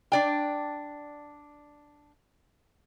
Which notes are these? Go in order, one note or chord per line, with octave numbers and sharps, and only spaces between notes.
D4 D5 G5